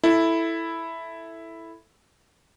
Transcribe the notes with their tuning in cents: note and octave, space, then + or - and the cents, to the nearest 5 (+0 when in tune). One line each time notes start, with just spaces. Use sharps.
E4 +0 A4 +0